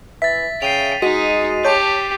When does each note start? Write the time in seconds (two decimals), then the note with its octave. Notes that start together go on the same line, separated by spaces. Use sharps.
0.22 E3 E5 A6 B6
0.62 C#3 G5 C7 D#7 F7
1.02 G#3 D#4 F#4 B6 D#7
1.65 G4 C#5 A5 G6